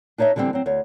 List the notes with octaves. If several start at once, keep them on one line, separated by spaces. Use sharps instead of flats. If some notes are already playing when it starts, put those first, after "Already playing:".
D4 D#4 C#5 D#5 E5
D3 E3 G3 A3 C4
F#3 C4
D2 C#5